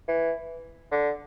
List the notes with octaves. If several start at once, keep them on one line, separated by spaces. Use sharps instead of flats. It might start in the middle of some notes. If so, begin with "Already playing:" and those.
E3
D3